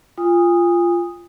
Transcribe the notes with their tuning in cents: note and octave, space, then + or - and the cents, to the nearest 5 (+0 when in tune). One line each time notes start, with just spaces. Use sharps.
F4 -10 G#5 -35 D#6 +0